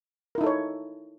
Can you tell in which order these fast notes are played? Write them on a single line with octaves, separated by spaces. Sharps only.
A#4 E4 D#4 A4 C#5